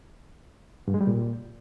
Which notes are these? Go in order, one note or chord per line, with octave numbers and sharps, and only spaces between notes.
G2
G#3
G3
A#2